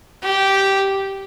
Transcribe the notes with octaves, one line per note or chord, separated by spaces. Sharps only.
G4